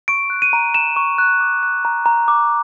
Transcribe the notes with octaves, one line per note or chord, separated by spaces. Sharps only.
C#6 D7
F#6
D#7
A#5
A#5 E7
C#6
F#6
D6
F#6
A#5
A#5
D6